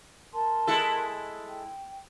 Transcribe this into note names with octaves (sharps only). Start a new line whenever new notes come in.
A#4 A5 C6
G#3 E4 A4
G5